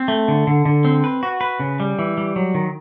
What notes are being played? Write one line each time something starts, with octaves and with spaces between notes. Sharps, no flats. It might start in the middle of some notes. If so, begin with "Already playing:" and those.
Already playing: C4
A3
D3
D3
D3
C4
B4
F#4
B4
C#3
G3
E3
G3
F#3
D#3